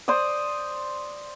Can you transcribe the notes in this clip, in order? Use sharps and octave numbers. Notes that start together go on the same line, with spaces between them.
C5 D5 D#6